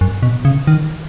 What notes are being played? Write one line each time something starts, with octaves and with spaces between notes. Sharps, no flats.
F#2
B2
C#3
D#3